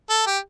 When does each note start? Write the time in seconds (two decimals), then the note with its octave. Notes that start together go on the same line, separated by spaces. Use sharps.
0.10 A4
0.27 G4